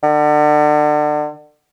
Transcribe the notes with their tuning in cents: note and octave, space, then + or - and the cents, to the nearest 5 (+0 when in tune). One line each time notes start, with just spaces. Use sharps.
D3 +35